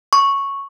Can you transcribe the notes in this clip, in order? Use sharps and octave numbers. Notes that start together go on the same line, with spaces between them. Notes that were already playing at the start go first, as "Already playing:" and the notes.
C#6